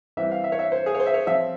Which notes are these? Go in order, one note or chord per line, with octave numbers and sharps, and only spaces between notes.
E3 G3 C4 E5
F5
E5
C#5
E5
C5
G#4
C#5
C5
E5
C#5
F3 C4 E5